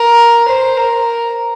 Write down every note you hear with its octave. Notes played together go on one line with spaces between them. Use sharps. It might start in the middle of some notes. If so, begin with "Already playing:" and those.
Already playing: A#4
C5
A#4